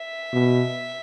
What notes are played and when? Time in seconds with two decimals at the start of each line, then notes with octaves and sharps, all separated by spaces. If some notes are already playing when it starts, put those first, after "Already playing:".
Already playing: E5
0.33 B2